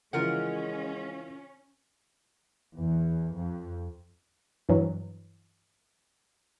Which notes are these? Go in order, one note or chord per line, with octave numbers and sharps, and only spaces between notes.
C#3 E3 F3 G#3 C#4 F4 A#4 F#5
E2
F2
G2 E3 F#3